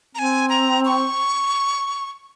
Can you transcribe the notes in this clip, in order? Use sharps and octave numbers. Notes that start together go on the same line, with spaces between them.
C4 G#5 A#5
A#5
C#6